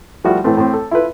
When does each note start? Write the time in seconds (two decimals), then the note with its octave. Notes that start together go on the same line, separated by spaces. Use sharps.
0.24 F3 G3 A3 E4 F#4
0.44 A2 E3 A3 C4
0.57 A2 C4
0.73 A4
0.91 E4 F4 A4 B4